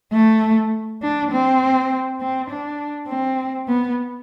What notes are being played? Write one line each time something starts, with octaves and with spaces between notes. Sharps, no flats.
A3
D4
C4
C4
D4
C4
B3